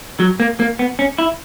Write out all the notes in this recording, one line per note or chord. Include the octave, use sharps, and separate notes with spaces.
F#3
A#3
A#3
B3
C#4
E4